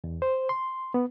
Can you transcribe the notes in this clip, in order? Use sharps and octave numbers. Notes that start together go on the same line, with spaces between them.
E2
C5
C6
B3